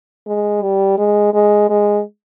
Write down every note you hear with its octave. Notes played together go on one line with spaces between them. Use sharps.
G#3
G3
G#3
G#3
G#3